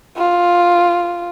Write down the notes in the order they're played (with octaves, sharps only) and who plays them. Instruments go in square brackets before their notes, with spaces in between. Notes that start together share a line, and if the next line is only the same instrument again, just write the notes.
[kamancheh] F4